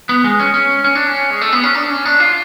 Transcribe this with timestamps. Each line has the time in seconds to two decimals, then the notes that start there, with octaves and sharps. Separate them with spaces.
0.09 B3
0.24 G#3
0.39 C#4
0.54 C#4
0.84 C#4
0.95 D4
1.07 C#4
1.30 G#3
1.41 A3
1.53 B3
1.64 C#4
1.75 D4
1.90 C#4
2.05 D4
2.20 F4